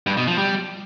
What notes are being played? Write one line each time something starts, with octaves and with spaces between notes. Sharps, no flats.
G2
B2
F3
G3